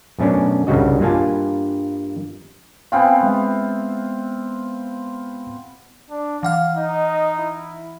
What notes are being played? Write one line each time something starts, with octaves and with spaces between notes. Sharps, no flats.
F#2 B2 A3 C#4 D4
C2 G2 C#3 F#4 D#5
G2 A#3 F4 G#5 A5
B3 C4 F4 F5 G5 G#5
G#3 E5
D4
E3 F5 F#5 F6
D#4 D#5
E4